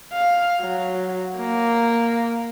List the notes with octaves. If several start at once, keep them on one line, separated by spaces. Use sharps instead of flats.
F5
F#3
A#3